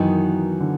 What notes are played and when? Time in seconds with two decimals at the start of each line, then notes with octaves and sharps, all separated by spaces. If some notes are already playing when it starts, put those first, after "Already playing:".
Already playing: F#2 D#3 E3 F#3 B3 D#4
0.60 D3